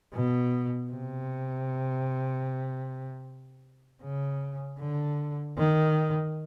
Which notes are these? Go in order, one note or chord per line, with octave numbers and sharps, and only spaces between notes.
B2
C3
C#3
D3
D#3